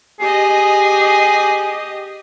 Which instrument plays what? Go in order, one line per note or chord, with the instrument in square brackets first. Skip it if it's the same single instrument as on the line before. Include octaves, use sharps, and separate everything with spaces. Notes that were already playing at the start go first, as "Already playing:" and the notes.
[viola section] G4 D#5 [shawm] G#4